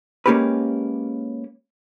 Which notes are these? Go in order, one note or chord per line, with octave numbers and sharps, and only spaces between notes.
G#3 A#3 C#4 G4 A#4 B4